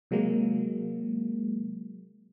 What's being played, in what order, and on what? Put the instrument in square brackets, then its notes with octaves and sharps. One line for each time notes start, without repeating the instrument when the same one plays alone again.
[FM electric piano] C3 F#3 G#3 A#3